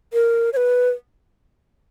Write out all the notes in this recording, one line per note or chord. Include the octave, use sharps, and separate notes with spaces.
A#4
C#5
B4